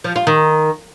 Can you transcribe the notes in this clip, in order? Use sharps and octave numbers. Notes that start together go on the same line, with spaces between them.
F3
F4
D#3